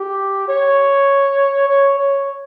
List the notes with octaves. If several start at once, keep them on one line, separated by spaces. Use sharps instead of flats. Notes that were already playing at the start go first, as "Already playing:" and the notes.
Already playing: G4
C#5
C#5
C#5